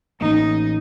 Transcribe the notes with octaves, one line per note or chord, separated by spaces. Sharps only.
A1 A#3 D#4